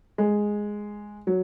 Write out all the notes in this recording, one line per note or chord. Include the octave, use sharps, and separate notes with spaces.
G#3
F#3